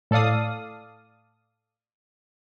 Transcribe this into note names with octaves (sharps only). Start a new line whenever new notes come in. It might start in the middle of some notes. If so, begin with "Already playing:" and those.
A2 A4 D5 F5 D#6